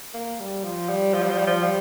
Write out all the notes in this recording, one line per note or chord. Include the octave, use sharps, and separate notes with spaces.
A#3
G3
F3
G3
F3
G3
F3
G3
F3
G3